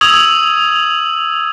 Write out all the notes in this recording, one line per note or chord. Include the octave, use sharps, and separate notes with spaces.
C#6 D#6 E6 G#6 F7 F#7